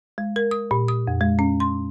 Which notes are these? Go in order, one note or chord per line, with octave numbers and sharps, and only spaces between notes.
G#3
A#4
D#6
A#2
D#6
F2
G#3
C#4
C6